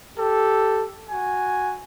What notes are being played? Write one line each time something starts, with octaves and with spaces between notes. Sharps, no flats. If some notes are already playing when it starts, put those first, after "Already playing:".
G4 A4
F#4 G#5